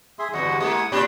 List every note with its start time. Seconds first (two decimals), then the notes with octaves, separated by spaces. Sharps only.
0.19 G#4 E5 C6
0.34 E2 G2 D3 F#4 D#5 F#5
0.60 G#3 A#3 E4 F#5 D#6
0.92 A2 D4 G4 B5